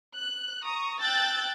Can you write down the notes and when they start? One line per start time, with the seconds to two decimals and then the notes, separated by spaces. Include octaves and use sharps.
0.16 F#6
0.63 A#5 C#6 D#6
1.01 G5 A5 E6 F#6 G6 A6